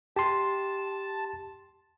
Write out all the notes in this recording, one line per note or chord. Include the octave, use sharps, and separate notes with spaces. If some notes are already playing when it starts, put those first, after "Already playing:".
G4 A5 C6